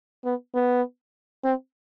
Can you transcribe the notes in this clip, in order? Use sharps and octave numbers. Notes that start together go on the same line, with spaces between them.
B3
B3
C4